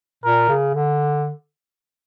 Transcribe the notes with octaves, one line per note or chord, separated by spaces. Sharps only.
A#2 A#4
C#3
D3